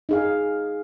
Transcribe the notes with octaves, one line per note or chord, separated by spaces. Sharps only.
D#4 G#4 F5